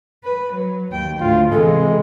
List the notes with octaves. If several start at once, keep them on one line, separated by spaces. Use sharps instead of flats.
B4
F#3
D#2 G5
D2 A2 F4
C3 E3 G#3 A4